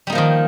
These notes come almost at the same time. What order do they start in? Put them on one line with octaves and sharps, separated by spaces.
G3 D#4 A#3 F3 D#3